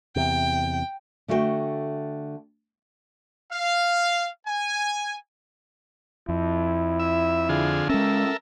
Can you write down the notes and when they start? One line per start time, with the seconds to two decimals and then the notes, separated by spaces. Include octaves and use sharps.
0.16 E2 C3 G5
1.28 D3 A3 F#4 F5 G5
3.52 F5
4.47 G#5
6.28 F2 E4
6.99 E5
7.49 D3 F4 G#4
7.89 G#3 C#4 A4 A#4 E5